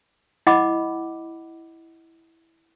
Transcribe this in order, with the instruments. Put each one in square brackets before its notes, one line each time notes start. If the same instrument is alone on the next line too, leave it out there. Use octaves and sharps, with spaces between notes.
[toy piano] E4 D#5 F#5 B5 D6